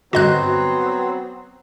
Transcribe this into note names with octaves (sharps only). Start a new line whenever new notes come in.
G2 D3 F#3 B3 C4 F#4 D#5 F#6